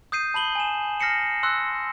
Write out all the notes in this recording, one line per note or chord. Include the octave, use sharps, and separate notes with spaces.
D#6 G6 C7 D#7
A5 B5 F#7 G7
G#5 E7
F6 A#6 C7 C#7 E7
C6 E6 F#6